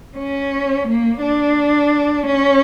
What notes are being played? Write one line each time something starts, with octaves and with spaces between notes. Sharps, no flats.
C#4
A#3
D4
C#4